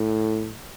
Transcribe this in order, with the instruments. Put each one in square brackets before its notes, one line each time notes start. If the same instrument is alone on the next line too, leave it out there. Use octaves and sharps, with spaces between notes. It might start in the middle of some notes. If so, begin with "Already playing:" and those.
Already playing: [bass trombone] A2